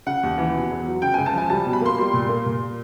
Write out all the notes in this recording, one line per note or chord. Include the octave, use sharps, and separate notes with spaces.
C#3 F#5
D#2
E3
B2
E2
F#3
C#3 G5
C#2 G#5
A5
F3 G#5
G3 A5
B2
B5
A#3 C6
G3
A#2
A#3
A#2